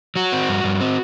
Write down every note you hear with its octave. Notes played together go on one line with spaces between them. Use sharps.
F#3 F#4
C4
G2
G2
C4